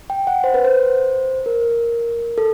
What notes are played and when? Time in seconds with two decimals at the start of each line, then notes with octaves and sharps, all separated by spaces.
0.10 G5
0.27 F#5
0.44 C5
0.54 B4
0.65 C5
1.46 A#4
2.38 A4